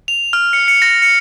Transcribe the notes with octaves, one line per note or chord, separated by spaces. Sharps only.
F7
F6
C#7
C#7
A#6
C#7